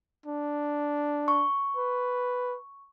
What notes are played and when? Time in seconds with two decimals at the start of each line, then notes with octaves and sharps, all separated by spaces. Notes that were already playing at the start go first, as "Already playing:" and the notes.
0.26 D4
1.28 C#6
1.77 B4